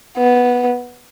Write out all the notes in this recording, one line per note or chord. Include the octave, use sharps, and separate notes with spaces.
B3